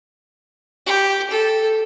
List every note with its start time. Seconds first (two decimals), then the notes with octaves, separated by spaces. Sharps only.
0.86 G4
1.30 A4